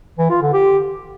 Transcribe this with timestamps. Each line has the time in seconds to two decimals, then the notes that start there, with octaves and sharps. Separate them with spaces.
0.18 E3
0.30 F4
0.42 D3
0.53 G4